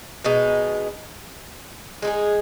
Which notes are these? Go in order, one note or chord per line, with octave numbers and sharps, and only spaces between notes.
B2 G#3 D#4
G#3 D#4 G#4